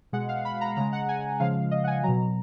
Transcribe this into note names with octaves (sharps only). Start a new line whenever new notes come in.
B2 G#3 F#5
F5
B5
A#5
C#3 G#3 A#5
F#5
G#5
C#3 F3 G#3 F5
D#5
F#5
G#5
B2 F#3 A#5